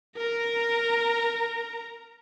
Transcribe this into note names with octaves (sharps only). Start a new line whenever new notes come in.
A#4 A#5